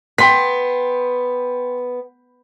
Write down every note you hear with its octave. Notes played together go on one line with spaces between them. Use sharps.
B3 G5 C6 B6